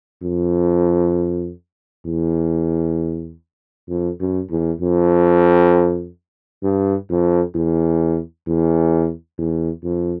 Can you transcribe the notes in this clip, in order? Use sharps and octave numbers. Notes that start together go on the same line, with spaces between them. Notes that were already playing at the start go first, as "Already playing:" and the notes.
F2
E2
F2
F#2
E2
F2
G2
F2
E2
E2
E2
F2